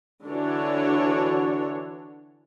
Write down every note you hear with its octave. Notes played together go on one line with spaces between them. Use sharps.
D3 E3 D4 F#4 C#5